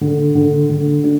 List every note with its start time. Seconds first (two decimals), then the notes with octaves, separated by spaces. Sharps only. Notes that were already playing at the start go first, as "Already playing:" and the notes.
0.01 D3
0.35 D3
0.69 D3
1.04 D4